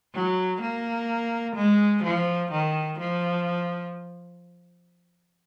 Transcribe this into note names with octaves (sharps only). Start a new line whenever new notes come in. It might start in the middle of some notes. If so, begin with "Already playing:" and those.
F#3
A#3
G#3
F3
D#3
F3